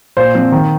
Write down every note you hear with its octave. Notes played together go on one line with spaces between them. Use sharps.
A#2 C5
F3 C4
D#3